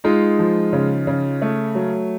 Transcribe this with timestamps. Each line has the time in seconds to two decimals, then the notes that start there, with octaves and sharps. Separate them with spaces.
0.04 G#3 D#4 F4
0.39 F3
0.73 C#3
1.07 C#3
1.42 A3
1.75 F#3